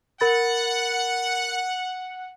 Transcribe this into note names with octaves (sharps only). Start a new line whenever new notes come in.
A#4 F#5 B5 A6